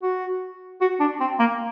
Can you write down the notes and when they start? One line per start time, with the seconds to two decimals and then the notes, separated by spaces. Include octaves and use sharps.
0.02 F#4
0.81 F#4
1.00 D4
1.20 C4
1.39 A#3